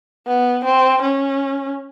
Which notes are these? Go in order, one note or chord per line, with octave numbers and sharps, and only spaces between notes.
B3
C4
C#4